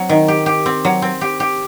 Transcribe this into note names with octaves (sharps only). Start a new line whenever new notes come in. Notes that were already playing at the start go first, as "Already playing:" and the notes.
Already playing: F#3 C4
D#3
G4
G4
C4
F#3
C4
G4
G4